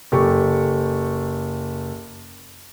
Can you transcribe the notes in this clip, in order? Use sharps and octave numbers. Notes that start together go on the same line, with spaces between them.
F#1 G4 A4 C#6